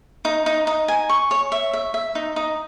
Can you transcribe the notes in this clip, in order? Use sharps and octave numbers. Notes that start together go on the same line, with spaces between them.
D#4
D#4
D#4
G#5
C#6
C#5
E5
E5
E5
D#4
D#4